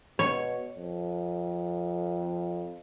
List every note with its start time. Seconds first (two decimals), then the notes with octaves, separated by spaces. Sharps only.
0.19 B2 C#5
0.78 F2